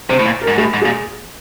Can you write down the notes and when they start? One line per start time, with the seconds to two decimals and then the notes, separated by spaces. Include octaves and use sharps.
0.09 C3 C5
0.19 A2
0.26 A#2
0.42 A#4
0.47 G#2
0.58 A2 G#4
0.74 G#2
0.82 A#2 G#4